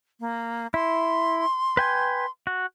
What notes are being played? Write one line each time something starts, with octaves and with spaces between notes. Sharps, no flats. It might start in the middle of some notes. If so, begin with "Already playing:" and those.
A#3
E4 C6
B4 G5 G#5
F#4